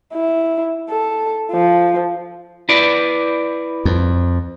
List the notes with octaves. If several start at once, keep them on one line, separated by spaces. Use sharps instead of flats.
E4
A4
F3
E4 B4 D5
F2